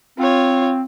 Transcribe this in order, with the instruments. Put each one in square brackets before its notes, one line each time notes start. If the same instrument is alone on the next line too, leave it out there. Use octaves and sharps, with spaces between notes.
[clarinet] C4 [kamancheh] F4 C#5